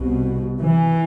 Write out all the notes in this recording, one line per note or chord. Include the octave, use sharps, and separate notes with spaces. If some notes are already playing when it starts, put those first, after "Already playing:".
Already playing: C2 B2
E3